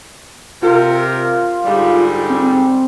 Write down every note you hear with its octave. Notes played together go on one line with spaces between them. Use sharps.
C3 F4 A#4
G#2 D3 G3
C4